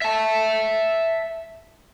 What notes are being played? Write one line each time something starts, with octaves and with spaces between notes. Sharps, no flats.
E5 A5